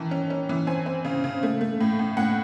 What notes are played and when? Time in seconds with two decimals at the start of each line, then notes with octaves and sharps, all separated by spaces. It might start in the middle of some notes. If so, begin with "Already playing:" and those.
Already playing: D#3 E3 A5
0.11 C#4
0.30 C#4
0.49 E3
0.67 C4 G#5
0.86 C4
1.05 C#3
1.24 C#3
1.43 A3
1.61 A3
1.81 A2
1.99 A2
2.17 A2 F#5